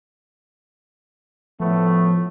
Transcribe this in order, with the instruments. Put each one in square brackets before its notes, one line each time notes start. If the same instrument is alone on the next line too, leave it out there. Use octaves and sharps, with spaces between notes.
[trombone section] A2 A3 B3 [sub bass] F3